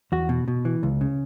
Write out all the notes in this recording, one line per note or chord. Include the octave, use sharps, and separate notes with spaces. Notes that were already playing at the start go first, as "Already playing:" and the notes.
E2 F#4
B2
B2
E3
C#2
C#3